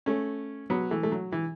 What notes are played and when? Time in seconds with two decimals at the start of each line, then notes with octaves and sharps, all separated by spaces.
0.06 A3 C#4
0.70 F#3 B3
0.91 E3 A3
1.03 A3
1.12 F#3
1.32 E3